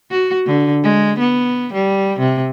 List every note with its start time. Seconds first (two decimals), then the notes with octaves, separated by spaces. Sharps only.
0.11 F#4
0.46 D3
0.84 G#3
1.19 B3
1.73 G3
2.19 C3